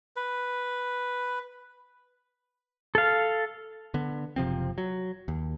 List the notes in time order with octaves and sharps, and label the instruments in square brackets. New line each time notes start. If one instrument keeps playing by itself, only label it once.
[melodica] B4
[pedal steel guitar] A4 F5
[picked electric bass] D3 B3
F#1 C3 F3 C4
F#3
D#2